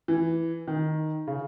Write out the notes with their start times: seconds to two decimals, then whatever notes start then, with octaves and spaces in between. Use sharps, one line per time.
0.08 E3
0.68 D#3
1.27 C#3